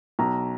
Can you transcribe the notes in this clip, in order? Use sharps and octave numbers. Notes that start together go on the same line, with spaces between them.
B1 A#5